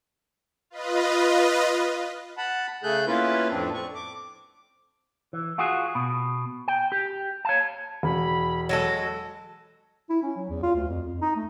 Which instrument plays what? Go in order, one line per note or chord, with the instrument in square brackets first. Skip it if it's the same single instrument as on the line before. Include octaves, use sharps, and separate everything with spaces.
[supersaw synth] F4 B4 D#5
[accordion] F#5 A5 B5
C#3 A3 G#4 A4 F#6 G6
A#3 B3 C#4 E4 F4 B4
F2 A2 C4 D4
C4 C#6
D6
[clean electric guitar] E3
F4 F#4 G#4
B2
G5
G4
C#5 F5 A5
[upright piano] E1 [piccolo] B5
[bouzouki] F#3 G#3 A4 [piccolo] A#6
[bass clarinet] E4
C#4
F#3
E2
F4
D2
F2
F2
D#4
A3